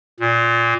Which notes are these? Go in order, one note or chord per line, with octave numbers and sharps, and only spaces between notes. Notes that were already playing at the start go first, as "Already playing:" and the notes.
A#2